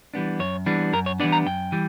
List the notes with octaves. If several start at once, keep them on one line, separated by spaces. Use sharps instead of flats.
E3 G3 B3 D4
F#2 C#5
E3 G3 B3 D4
F#2 A#4
C#5
E3 G3 B3 D4 D5
A#5
F#2 G5
E3 G3